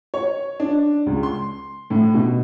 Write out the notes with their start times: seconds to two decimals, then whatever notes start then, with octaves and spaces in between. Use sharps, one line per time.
0.14 C#5
0.60 D4
1.07 C#2
1.23 C6
1.90 A2
2.14 B2